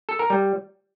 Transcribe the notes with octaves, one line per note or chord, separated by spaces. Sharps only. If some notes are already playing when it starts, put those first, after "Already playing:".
A4
A#4
G3